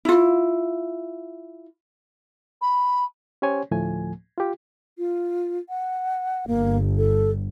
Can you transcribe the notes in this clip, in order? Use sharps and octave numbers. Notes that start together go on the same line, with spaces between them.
E4 F4
B5
C#4 G4 C5 C#5 G#5
D2 A2 F3 A3 G#5
F4 G4
F4
F#5
G1 A#3
A4